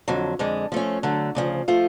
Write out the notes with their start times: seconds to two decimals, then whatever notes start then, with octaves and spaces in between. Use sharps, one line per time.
0.08 F2 D3 F#3
0.39 F2 D3 G#3
0.72 F3 A3 C#4
1.03 D3 F#3 A3
1.35 D2 C#3 F3
1.68 F3 A3 F4